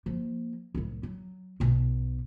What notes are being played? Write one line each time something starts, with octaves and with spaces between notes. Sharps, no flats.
F3 A#3
C2 A2
F#3
B1 B2